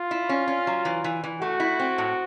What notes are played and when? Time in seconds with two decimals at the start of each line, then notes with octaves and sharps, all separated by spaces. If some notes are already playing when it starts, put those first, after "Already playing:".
Already playing: F4
0.11 E4
0.29 C#4
0.48 C#4
0.67 F#3
0.85 E3
1.04 E3
1.24 E3
1.41 A3 F#4
1.60 E4
1.79 C4
1.98 A2